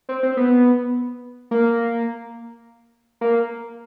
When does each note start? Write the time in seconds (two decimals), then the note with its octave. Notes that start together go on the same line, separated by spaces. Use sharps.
0.09 C4
0.23 C4
0.37 B3
1.51 A#3
3.21 A#3